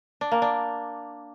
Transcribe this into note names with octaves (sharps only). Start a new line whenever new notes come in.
D4
A#3
D4